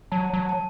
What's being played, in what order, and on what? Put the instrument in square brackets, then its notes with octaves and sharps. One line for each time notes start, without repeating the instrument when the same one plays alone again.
[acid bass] F#3 [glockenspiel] A5
[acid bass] F#3
[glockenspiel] A5